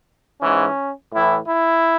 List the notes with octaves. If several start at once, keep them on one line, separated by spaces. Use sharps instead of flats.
G#2 E3 C#4
A2 E3 E4
E4